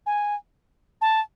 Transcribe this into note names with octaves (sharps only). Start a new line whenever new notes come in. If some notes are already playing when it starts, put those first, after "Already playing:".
G#5
A5